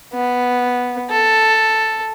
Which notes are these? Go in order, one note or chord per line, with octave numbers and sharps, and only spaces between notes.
B3
A4